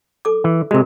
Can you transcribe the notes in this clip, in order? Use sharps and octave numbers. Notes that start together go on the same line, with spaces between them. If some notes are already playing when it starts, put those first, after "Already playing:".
A4 D6
E3
C3 G#3 F#4 A#4